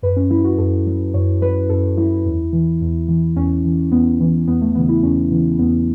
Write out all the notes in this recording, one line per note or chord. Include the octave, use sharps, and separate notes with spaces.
F#2 B4
C#4
F#3 E4
F#4
F#2 A4
F#3
F#2 C#5
F#3 B4
F#2 A4
F#3 E4
E2
E3
E2
E3
E2 C#4
E3
E2 B3
E3
E2 B3
A3
C#3 E3 B3
E4
E2 C#4
C#3 E3
E2 B3